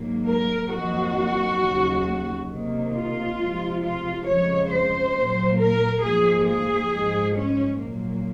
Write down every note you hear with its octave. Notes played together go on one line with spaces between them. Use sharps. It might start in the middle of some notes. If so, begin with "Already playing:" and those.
Already playing: G#2 F#3 A#3
A#4
F2 D#3 F#3 A#3 F#4
D#2 C#3 F#3
C3 D#3 A#3
F4
C3 F3 G#3
F4
F2 C#3 F3 G#3 C#5
C5
A#2 F#3 A#3
A#4
G#2 F3 A#3 G#4
G#4
G#2 F3 G#3
C#4
A#2 F#3 A#3